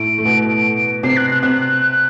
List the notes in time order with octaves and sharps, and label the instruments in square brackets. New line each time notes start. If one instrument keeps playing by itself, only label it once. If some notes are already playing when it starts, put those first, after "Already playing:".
Already playing: [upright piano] A2 A3 [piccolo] D7
[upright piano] A3
B2 B3
[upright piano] C3 C4 [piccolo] C7
[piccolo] F#6
F#6
[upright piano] C3 C4 [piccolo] F#6